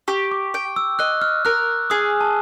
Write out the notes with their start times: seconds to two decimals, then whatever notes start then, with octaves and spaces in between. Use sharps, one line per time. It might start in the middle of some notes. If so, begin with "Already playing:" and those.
0.08 G4 C#6
0.32 D6
0.54 G5
0.76 E6
0.99 D#5 F#6
1.22 F6
1.45 A#4 F#6
1.90 G#4 D#6
2.21 A5